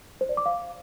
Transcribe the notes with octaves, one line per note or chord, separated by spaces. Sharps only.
C5
D5
D6
F5